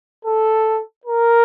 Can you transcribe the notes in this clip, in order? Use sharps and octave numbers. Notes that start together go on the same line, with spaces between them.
A4
A#4